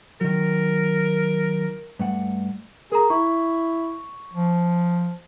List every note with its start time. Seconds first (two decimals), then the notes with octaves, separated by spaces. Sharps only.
0.21 D#3 F#3 A#4
1.99 G2 A3 F#5
2.92 G#4 A#4 A#5
3.10 E4 C#6
4.33 F3